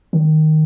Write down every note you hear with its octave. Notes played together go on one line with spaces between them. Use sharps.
D#3